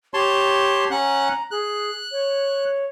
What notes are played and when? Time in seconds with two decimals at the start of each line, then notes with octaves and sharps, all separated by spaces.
0.14 G4 C#5 A5 C6
0.91 C#4 F#5 A#5 F#6
1.51 G#4 F#6
2.12 C#5